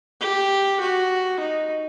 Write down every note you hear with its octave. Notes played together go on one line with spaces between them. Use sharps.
G4
F#4
D#4